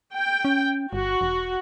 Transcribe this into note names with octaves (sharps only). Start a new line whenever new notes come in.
G5
C#4
G1 F#4
E1